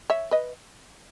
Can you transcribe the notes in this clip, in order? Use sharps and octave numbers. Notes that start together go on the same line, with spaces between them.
C#5 E5
B4 D#5